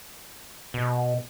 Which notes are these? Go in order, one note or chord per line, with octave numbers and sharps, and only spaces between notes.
B2